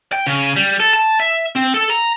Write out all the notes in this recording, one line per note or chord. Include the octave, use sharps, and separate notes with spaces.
G5
C#3
G3
A4
A5
E5
C4
A4
A#5